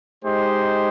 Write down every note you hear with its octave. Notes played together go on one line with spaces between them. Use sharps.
G#3 D#4 G4 C5